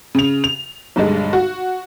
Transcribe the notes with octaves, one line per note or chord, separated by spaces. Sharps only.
C#3 F7
F7
B1 G2 D3 G#3
F#4